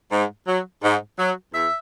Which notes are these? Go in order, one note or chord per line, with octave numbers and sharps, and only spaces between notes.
G#2
F#3
G#2
F#3
E2 E5